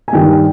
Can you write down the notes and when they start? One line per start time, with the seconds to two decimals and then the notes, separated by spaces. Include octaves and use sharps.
0.08 G#5
0.13 G2 D#3 G3 G5